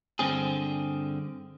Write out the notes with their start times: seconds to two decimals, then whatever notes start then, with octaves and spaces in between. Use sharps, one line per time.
0.19 G2 D3 C4 G#4